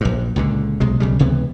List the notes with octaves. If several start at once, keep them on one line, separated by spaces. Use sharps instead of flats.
A#1 G2
C#2 A#2 D3
B1 C3 G#3
B1 C#3 G3
C#2 C3 E3 B3